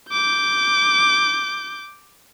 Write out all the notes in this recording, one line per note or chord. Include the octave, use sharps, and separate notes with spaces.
D6 G6